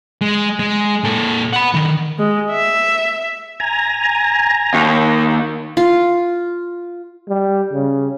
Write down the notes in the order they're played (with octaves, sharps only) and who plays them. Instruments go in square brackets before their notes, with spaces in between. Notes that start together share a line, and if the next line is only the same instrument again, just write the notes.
[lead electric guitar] G#3
G#3
A#2 A4
F#5 B5
D3 D#3
[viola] G#3
E5
[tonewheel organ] G#5 A#5
[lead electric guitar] D#2
[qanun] F4
[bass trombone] G3
C#3